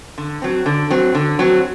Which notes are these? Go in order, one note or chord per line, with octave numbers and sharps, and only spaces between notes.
D3
F#3 C4
D3
F#3 C4
D3
F#3 C4